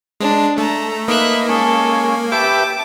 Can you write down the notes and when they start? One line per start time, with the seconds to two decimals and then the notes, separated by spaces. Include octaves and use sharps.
0.20 G#3 D4
0.58 A3 A5 A#5
1.08 A#3 D#4 B4 E5 F#6
1.49 G#3 C#4 A4
2.32 G4 B4 E5 A5 D6